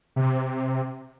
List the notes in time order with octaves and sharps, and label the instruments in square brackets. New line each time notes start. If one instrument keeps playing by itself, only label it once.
[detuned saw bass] C3